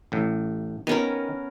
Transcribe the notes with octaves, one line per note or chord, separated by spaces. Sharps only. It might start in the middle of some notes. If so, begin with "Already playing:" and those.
A1 A2
D#3 B3 C#4 A#4